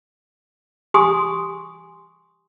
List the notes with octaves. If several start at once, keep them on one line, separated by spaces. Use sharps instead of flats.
G4 G#5 C6 D#6